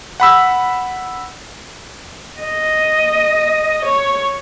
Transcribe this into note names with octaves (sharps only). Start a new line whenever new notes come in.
F#5 B5 E6
D#5
C#5